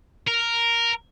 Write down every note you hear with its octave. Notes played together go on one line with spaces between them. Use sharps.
A#4